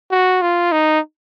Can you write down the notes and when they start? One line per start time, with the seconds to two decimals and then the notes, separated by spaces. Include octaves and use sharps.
0.11 F#4
0.41 F4
0.72 D#4